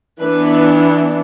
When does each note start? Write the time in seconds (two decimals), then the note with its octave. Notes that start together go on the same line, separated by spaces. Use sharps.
0.21 E3 B3 D4 B4